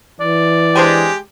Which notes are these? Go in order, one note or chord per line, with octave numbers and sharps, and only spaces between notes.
E3 D5
G#3 D4 G4 C5 G#5